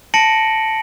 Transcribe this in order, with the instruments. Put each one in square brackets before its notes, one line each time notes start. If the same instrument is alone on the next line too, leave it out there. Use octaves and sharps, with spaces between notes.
[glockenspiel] A5 A#6 C#7 D7 F#7